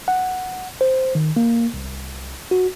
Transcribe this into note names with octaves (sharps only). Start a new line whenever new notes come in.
F#5
C5
D#3
A#3
C2
F#4